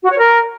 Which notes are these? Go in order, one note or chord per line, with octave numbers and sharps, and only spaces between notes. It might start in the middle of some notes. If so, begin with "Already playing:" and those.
F#4
C#5
A#4